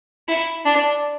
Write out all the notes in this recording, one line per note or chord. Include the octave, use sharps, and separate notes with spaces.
E4
D4